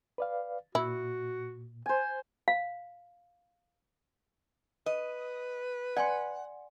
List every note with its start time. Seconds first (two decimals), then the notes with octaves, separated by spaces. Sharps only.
0.18 B4 D5 F5
0.75 A#2 E4 F#4
1.86 C5 G#5
2.48 F5
4.86 B4 D#5
5.97 D5 F#5 G#5 C6